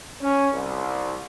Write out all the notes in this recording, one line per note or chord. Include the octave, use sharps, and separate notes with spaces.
C#4
C2